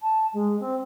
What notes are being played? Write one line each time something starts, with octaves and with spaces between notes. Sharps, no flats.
A5
G#3
C4